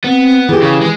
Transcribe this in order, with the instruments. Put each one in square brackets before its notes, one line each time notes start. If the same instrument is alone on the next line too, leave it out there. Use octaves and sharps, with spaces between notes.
[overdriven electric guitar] B3 [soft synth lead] C4
[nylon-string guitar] E3 G4 [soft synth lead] G#4
[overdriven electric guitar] C#3
G#3